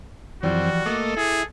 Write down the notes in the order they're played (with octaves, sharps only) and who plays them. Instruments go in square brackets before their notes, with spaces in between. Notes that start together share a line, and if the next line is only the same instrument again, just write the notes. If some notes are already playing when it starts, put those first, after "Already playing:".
[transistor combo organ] F#2 C4 [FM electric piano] E3 F3 [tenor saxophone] G3 [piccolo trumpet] F#4
[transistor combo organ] A3 A#3 D#5 [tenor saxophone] A4 [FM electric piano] D6
[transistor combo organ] E4 [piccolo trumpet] G#4